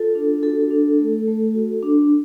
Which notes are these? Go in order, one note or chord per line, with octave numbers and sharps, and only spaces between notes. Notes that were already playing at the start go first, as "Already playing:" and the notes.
Already playing: F4 A4
D4
F#4 A4
D4
A3
A3
F#4
D4